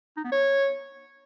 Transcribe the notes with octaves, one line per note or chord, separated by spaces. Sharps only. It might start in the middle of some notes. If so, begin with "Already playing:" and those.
D#4
B3
C#5